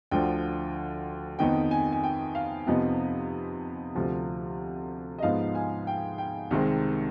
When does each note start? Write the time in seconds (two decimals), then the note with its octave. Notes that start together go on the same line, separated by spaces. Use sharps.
0.11 D2 D3 F3 G5
1.39 F2 D#3 B3 D#4 G5
1.71 G#5
1.92 G#5
2.04 G5
2.35 F5
2.67 F2 C3 F3 B3 D#4 D#5
3.95 D2 C3 F3
5.18 D#5
5.23 G#2 F3 B3 D#4 F5
5.55 G#5
5.87 G5
6.18 G5
6.51 C2 C3 D#3 G#3 C4